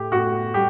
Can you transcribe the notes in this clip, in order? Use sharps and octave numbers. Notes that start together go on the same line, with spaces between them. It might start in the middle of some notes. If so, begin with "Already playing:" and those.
Already playing: A2 G4
A2 F#4
G3 G4